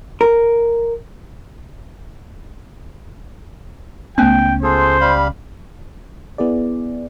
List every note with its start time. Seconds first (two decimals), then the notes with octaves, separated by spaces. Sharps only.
0.21 A#4
4.18 C#2 A3 B3 C#4 G5
4.63 F4 G#4 A4 C5
5.01 G3 F5 B5
6.38 B3 E4 G#4 D5